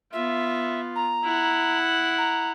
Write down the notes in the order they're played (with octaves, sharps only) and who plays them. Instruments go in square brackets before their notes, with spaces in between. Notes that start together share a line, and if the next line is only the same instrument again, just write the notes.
[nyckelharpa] B3 F4 [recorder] E5
[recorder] A#5
[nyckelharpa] E4 F#5
[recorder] A#5